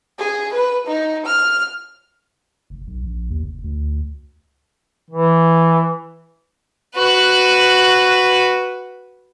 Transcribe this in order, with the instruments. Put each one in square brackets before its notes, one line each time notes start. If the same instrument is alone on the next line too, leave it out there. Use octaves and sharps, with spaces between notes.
[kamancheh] G#4
B4
D#4
F6
[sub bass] F1
B1
A#1
D#2
F1
D2
[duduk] E3
[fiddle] F#4 B4